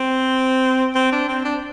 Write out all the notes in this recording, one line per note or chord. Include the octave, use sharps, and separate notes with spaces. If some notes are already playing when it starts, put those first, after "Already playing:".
Already playing: C4
C4
D4
C4
D4